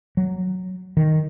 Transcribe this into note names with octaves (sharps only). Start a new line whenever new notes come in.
F#3
D#3